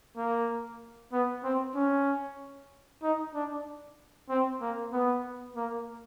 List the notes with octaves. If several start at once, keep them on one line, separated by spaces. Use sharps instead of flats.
A#3
B3
C4
C#4
D#4
D4
C4
A#3
B3
A#3